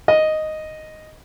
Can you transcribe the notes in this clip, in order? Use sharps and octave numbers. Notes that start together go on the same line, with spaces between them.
D#5